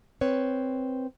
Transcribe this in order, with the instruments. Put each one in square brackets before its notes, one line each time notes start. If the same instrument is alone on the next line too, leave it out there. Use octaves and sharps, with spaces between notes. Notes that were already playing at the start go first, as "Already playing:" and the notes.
[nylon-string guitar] C4 B4 C#5